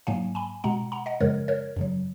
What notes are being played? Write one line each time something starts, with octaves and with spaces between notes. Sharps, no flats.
G#2 F#3 A#3 F5 G#5
G#5 B5
B2 G#3 F#5 A#5
F#5 A#5
D#5 F#5
F#2 C#3 F3 G#3 A#4 C#5
A#4 C#5
F#2 C#3 F#3